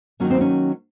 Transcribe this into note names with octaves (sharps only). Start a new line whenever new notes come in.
D#3 F#3 A#3 C#4
C4
C#4